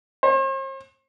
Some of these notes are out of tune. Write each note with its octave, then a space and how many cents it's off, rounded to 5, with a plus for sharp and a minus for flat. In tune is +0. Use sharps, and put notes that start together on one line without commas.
C5 +45